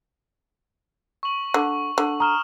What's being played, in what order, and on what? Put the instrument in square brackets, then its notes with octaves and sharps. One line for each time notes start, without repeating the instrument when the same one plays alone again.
[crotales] C#6 F#7
[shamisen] D3
D3
[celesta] A#5 [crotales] D#6 F6 E7